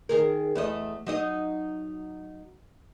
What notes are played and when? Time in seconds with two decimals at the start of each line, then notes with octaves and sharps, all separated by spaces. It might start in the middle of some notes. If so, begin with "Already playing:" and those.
0.09 D#3 G#4 A#4
0.55 E2 A3 D#5
1.07 F#3 D#4 D#5